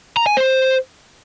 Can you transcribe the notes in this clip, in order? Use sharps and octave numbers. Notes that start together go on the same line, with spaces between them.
A#5
G#5
C5